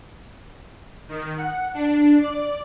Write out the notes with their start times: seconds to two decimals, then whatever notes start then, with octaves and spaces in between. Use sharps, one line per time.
1.09 D#3
1.37 F#5
1.74 D4
2.21 D5